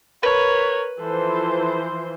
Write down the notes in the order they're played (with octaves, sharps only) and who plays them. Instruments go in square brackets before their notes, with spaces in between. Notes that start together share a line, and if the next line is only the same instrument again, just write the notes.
[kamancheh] A#4 C#5 [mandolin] B4
[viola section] E3 F3 C5 [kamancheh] A4